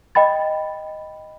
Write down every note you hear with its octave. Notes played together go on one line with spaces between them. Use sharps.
D#5 G5 B5 A6